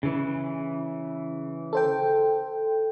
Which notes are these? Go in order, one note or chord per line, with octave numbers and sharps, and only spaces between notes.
C#3 E3
A4 C5 G5